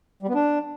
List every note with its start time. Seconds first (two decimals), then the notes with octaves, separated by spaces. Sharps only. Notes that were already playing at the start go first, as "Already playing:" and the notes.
0.23 G3
0.29 B3
0.35 D4